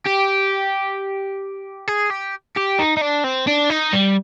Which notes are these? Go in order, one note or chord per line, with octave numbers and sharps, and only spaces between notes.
G4
G#4
G4
G4
D#4
D#4
D4
C4
D4
D#4
G3